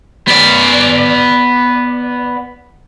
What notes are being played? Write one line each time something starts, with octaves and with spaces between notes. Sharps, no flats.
B3 D5